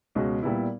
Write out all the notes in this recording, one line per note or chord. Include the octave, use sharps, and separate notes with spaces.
C#2 B2 G#3 C#4 F#4
A#2 G3 B3 E4